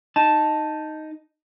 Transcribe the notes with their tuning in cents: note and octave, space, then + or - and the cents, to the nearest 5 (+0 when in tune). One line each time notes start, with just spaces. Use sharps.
D#4 +0 A5 +0